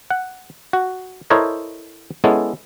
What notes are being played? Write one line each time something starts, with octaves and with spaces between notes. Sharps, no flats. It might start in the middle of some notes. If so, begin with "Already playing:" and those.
F#5
F#4
E4 A4 A#4 C5 C#5 D#5
G#3 B3 C#4 E4 A4